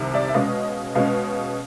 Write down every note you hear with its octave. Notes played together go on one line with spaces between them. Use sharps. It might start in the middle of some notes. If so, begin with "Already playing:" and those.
Already playing: C2 C3 D#3
D5 E5
E5
B2 G#3 C#4 D#5 F5
B2 G#3 C#4 D#5 F5